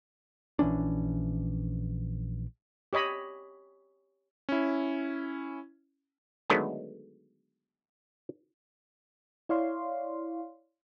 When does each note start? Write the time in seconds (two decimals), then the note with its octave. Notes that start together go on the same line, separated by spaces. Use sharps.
0.59 A#1 E3 C#4 D4
2.93 G4 C#5 D#5 B5
4.49 C#4 E4
6.50 D3 D#3 F#3 G#3 A3 B3
9.49 E4 C#5 D5 F5 C6